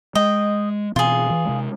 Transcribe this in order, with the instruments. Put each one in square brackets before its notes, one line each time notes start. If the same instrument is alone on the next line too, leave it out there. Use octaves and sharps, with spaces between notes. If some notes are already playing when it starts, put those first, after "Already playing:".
[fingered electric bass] G#3 [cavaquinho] D#5 G5
[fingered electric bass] B2 E3 C4 [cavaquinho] F4 G#4
[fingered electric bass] E3
C3 G#3